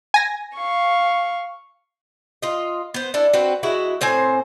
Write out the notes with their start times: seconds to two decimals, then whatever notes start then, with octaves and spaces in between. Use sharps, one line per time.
0.14 G#5 A#6
0.56 F5 C#6
2.42 F4 D#5
2.94 B3 C5
3.14 D4 E4 A4
3.33 C4 F#4 B4
3.63 G#3 E4 F#4
4.01 A2 C4 C5 G#5